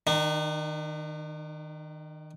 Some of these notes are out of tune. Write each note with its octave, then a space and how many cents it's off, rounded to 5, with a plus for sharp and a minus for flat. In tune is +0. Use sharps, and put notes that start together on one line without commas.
D#3 +0 D4 +45